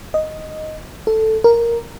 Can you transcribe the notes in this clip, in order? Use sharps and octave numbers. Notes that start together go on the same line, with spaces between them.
D#5
A4
A#4